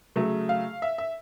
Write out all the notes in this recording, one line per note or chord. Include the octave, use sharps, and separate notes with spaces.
C#3 F#3 A3
F5
E5
E5